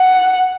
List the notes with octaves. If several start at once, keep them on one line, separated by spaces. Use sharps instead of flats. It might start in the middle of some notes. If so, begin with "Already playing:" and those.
Already playing: F#5